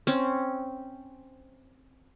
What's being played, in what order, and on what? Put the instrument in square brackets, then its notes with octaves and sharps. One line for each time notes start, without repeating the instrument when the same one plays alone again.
[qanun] C4 C#4